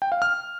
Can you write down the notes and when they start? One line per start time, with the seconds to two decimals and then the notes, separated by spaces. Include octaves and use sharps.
0.02 G5
0.12 F5
0.22 F6